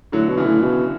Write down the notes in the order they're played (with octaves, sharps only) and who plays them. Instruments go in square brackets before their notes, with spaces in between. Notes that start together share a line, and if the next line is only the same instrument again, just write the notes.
[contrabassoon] A2 [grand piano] D3 F#3
[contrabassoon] B2
[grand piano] C#3 E3
[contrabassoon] A2
B2